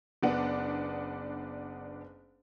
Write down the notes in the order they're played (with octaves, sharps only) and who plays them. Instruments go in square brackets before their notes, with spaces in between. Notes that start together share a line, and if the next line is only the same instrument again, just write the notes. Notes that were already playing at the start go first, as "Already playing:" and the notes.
[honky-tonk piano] F#1 B3 D4 F#5